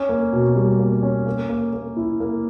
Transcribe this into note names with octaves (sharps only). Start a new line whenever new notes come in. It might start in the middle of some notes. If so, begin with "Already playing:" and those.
Already playing: C#4
A#3
B2
G3
A#3
C#4
A#3
A#3
A#3
E4
A#3